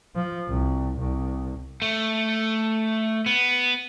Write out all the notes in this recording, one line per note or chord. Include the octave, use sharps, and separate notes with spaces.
F3
C2
C2
A3
B3